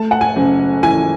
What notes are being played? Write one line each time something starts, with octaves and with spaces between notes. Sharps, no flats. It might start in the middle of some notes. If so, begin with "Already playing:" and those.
Already playing: A3 A5
F#5
G#5
F#1
E3 G#5